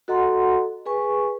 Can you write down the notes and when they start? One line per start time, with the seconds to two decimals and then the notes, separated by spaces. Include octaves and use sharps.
0.08 F#4 A4 D#5 F#5 A#5 C6
0.86 G#4 B4 G#5 C#6